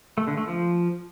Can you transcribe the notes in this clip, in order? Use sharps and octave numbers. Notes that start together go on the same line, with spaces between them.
A3
D3
A3
F3